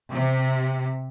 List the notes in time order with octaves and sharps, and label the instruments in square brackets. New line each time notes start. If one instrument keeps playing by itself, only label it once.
[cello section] C3